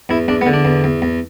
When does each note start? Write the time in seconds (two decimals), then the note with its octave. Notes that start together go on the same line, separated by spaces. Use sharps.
0.09 E2 E4
0.28 E2 D4
0.41 B3
0.46 D3
0.53 D4
0.65 E2
0.84 E2
1.02 E2